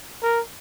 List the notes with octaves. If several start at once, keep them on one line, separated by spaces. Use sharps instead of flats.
A#4